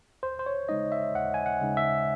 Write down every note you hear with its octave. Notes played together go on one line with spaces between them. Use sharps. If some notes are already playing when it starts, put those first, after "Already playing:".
D#2 C5
C5
C#5
C#3 G#3 D#4 D#5
E5
D#2 F#5
G#5
F#5
C#3 G#3 D#4
E5